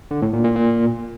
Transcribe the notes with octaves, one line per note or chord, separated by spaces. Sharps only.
D3
A2
A#2
A#2
A#2